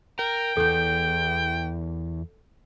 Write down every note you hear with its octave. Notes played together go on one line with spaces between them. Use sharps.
A#4 G5
E2 A4 G6